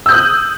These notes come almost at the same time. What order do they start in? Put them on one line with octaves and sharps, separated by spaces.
E6 G6 D#6 F#6